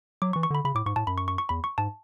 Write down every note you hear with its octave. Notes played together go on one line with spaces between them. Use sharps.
F#3 D6
E3 C#6
C#6
D3 B5
C#3 B5
A2 D6
G#2 C#6
A2 A5
F#2 B5
C#6
C#6
C#6
E2 B5
C#6
G#2 A5